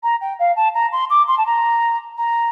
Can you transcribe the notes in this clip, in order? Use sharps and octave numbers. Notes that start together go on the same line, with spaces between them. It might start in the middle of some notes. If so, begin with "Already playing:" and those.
A#5
G5
F5
A5
A#5
C6
D6
C6
A5
A#5
A#5